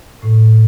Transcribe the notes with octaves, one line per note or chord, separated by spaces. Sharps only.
A2